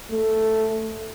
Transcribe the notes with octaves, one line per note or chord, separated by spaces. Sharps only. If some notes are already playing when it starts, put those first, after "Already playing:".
A3